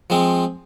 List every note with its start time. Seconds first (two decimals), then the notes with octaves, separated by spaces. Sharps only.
0.10 F3 G#3 C4